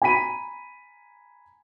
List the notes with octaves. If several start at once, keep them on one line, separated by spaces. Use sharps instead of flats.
G#5 A#5 B5 B6 D#7